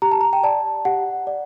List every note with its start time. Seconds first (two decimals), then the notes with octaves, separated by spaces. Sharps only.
0.02 G4 A#5
0.11 A5
0.21 A#5
0.33 G5
0.44 D5 A5
0.85 G4 F#5
1.27 D5